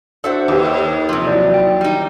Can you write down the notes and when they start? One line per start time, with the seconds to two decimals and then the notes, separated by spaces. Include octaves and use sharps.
0.24 D4 F#4 A4 C5 E5 F#5
0.48 D#2 G4 B4 C5
1.09 C3 F3
1.27 E3 F#3 D5
1.54 G5
1.81 G3 D#4